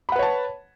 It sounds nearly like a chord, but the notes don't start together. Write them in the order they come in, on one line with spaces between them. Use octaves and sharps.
B5 F#5 B4 C#5 A5